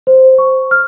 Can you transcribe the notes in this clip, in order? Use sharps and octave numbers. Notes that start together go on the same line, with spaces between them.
C5
C#6
F6